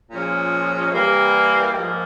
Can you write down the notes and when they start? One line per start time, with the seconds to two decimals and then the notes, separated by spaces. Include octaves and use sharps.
0.10 A#2 F3 G#3 C#4
0.91 E3 G3 A#3
1.72 G#2 F3 A#3